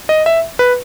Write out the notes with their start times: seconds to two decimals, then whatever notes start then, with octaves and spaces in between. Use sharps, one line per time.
0.09 D#5
0.26 E5
0.59 B4